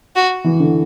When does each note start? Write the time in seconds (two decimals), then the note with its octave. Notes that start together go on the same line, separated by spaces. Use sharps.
0.16 F#4
0.44 E3
0.59 D3